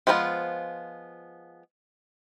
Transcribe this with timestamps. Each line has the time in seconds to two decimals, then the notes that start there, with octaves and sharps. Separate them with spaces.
0.07 F3 G#3 B3 D4 F4